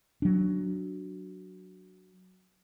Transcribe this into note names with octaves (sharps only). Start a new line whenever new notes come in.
F#3 D4